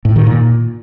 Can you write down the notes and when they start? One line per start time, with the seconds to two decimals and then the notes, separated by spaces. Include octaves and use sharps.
0.05 A2
0.16 D#3
0.27 A#2